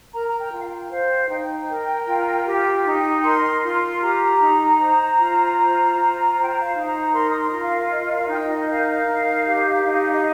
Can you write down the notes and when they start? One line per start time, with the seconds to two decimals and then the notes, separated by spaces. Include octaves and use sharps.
0.13 A#4 A#5
0.27 A#5
0.38 G5
0.52 F4
0.59 F5
0.65 G5
0.90 C5 F5
1.29 D#4 G5
1.69 A#4
2.07 F4
2.45 G4
2.85 D#4
3.24 A#4 C6
3.63 F4 C6
4.01 G4 A#5
4.40 D#4
4.79 C5
5.19 F4
5.57 C5
5.96 F4
6.35 C5 A#5
6.43 G5
6.50 A#5
6.61 F5
6.74 D#4
6.86 A#5
7.13 A#4 C6
7.30 D#6
7.39 C6
7.51 F4
7.64 F5
7.82 F5
7.90 A#4 D#5
8.10 F5
8.29 D#4 G5
8.49 D#5
8.69 A#4 F5
9.08 D#4
9.46 G4
9.85 D#4
10.13 D#5